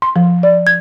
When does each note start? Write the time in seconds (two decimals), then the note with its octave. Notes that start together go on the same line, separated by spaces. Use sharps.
0.02 C6
0.16 F3
0.43 D5
0.67 G#6